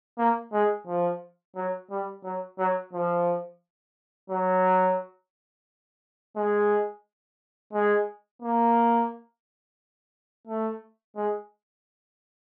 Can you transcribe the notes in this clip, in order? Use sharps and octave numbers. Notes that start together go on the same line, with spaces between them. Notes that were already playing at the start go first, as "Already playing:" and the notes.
A#3
G#3
F3
F#3
G3
F#3
F#3
F3
F#3
G#3
G#3
A#3
A3
G#3